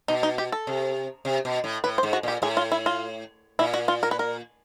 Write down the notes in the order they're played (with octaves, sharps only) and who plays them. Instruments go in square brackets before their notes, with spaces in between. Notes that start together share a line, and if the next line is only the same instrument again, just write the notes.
[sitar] B2 [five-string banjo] D#4
[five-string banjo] D#4
G4
A4
[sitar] C3
C3
B2
A2
[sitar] A2 [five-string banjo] B4
[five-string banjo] C5
[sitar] G#2
[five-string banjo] F#4
[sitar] A#2 [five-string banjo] G4
[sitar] A2 [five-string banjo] G#4
[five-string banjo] F4
E4
F4
[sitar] A#2 [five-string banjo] E4
[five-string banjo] F#4
F4
A#4
B4
A#4